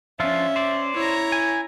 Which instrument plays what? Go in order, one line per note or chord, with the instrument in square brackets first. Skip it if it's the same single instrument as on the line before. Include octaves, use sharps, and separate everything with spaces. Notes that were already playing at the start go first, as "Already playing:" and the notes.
[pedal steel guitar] F3 D4 F4 [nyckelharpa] C#4 [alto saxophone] E5
[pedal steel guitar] C5 D5
[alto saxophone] E4 [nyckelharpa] C#5 A#5
[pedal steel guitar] G#5